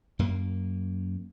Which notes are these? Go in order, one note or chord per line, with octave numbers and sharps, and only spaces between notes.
F#2 A#3